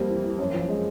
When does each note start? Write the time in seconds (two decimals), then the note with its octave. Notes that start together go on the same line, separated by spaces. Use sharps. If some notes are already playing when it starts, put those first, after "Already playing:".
Already playing: F2 G3 A#3 C4
0.09 E3
0.24 E3
0.39 F#2
0.54 F3
0.69 G#3